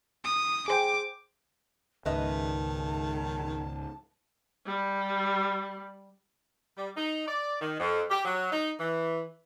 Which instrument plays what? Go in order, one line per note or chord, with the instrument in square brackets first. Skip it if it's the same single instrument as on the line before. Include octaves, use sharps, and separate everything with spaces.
[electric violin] D#6
[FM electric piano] G#4 C5 G5 [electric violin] D6
[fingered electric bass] C#2 G#2 [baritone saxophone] D#3 [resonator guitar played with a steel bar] B4 D#5 E5 [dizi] A5
[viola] G3
[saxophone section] G3
D#4
D5
D#3
F2
G4
F#3
D#4
E3